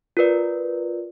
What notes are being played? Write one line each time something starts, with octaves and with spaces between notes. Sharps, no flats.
F4 A#4 B4 D5